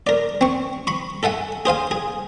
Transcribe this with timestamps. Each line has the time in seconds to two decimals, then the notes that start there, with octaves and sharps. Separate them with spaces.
0.07 A#4 D5
0.41 C4 C#6
0.87 B5 C#6
1.23 A4 E5 F#5 G#5
1.66 G#4 C5 F5 G#5
1.91 G#4